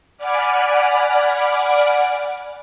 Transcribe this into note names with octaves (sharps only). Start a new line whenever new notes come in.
D5 F#5 G#5 B5 D6 F6